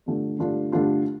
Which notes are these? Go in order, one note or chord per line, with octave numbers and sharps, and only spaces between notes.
G2 D3 A3 D4 F4
G2 D3 A3 D4 F4
G2 D3 A3 D4 F4